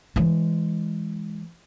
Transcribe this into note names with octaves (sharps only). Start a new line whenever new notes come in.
E3 G#3